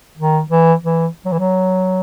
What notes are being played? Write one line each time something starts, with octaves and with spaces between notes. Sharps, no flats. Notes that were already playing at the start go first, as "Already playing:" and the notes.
D#3
E3
E3
F#3
E3
F#3